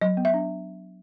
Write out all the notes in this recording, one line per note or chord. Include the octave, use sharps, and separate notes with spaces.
F#3 D#5
B3
E5
D4